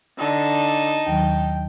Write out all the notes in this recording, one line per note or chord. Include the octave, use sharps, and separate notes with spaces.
D3 D#4 A5
D#2 D#3 F#3 G5